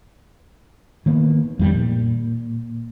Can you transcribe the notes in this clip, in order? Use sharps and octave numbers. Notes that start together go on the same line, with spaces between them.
D#3 A#3 B3
F2 D#3 G3
A#2